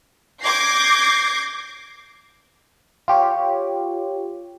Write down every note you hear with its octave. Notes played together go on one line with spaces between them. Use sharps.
D6 G6 G#6 A#6 C7
F4 G4 C#5